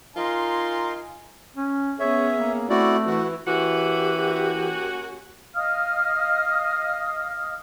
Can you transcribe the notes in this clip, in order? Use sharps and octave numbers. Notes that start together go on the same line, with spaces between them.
D#4 F4 A#4 G#5 C6
C#4
B3 C#4 G#4 C#5 E5
A#3
A3 C4 E4 F#4 D5
E3 E4 F#4
E3 A#3 C#4 F#4 G4
D#5 F5 D#6 F6